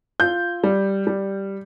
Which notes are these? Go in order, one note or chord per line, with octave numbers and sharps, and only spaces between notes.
F4 G6
G3
G3